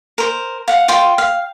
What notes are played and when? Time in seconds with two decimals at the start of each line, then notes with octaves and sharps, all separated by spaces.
0.18 A#4 C5
0.68 F5 F#5
0.88 F4 G5 C6
1.18 F5